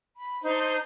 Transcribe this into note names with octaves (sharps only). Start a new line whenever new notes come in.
B5
D4 D#4 C5